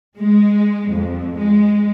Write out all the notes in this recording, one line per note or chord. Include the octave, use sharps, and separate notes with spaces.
G#3
F2
G#3